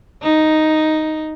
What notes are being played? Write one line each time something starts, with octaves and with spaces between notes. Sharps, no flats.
D#4